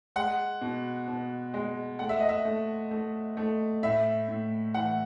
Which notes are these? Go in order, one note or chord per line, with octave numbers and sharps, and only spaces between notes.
G#3 F#5
B2
B2
G#3
A3 F#5
E5
D#5
E5
A3
A3
A3
A2 E5
A2
E3 F#5